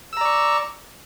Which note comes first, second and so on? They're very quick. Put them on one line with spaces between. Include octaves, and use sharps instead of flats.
E6 A#5 D5 C#6